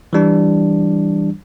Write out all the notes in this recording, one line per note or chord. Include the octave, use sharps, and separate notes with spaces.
E3 G3 D4